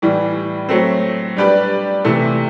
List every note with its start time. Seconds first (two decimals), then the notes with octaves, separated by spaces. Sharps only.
0.02 A2 E3 G3
0.69 F#3 A3 C4
1.36 G3 D4 G4 B4 D5
2.05 C3 E3 A3